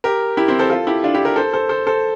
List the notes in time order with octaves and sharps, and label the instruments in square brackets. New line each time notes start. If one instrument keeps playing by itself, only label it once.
[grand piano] G4 A#4
E4 G4
C4 E4
A4 C5
F4 A4
E4 G4
D4 F4
E4 G4
G4 A#4
A4 C5
A4 C5
A4 C5
A4 C5